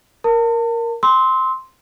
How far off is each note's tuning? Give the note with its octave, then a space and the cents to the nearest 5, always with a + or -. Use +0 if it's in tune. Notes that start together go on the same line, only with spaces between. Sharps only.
A#4 +0 A5 +35
C6 +0 E6 -35